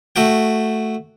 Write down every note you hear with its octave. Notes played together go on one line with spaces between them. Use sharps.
A3 F#4 G5